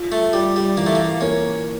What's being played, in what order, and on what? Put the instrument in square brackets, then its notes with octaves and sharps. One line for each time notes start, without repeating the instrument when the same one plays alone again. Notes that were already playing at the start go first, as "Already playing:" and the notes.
Already playing: [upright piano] F4
[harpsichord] A3
[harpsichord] G3 [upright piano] F4
[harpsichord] G3
[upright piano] E3 [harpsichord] A#3
[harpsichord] A3
A#3
[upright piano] A#3 [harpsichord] C#4